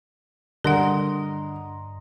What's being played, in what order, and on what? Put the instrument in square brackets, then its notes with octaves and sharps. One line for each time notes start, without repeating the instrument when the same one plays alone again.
[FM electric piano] G2 [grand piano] D3 [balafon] A#4 D5 F#5 [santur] D#5 A#5 C6